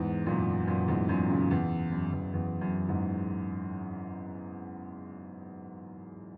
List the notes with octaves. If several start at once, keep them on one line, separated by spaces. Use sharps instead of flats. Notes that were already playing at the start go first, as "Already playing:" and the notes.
Already playing: E2 G#2
F#2 A#2
F#2 A#2
E2 G#2
F#2 A#2
A#2 C#3
E2
F#2
E2
E2
F#2
E2 G#2